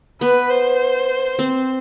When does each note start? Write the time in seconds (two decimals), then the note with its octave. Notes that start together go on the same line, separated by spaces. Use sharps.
0.21 B3 B4
0.50 C5
1.39 C4